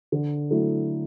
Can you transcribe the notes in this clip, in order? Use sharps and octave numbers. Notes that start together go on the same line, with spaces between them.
D3
F#3 A3 E4